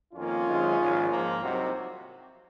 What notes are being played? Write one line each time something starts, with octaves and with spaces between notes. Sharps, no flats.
F2 D#3 A#3 C#4 F4
F#2 D#3 G#3 C4
A#1 G#2 D#3
G#2 F3 A#3
C2 C3 F#3 C4 D#4 F#4